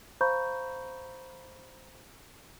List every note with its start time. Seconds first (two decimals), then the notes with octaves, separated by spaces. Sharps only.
0.21 C5 F5 A#5 B5 C#6 G6